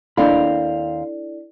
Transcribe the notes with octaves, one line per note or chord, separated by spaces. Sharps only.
D#2 C4 D4 E4 A4 D5 F5 B5